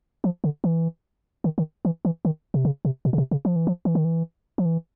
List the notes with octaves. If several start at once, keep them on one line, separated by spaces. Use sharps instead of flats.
F3
D3
E3
D#3
D#3
E3
E3
D#3
C3
C#3
C3
B2
C#3
C3
C#3
F3
E3
F3
E3
D#3
E3
F3
E3